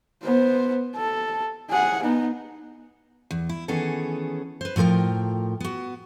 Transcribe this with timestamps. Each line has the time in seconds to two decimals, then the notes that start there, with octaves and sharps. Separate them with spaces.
0.24 B3 C5
0.96 A4
1.70 G#4 F#5
2.03 B3 D#4
3.31 E2
3.49 E4
3.68 D#3 E3 B3 C#4 G#4 A4
4.61 B4 C5
4.76 A2 F3 F4 A#4 G5
5.60 B3 F#4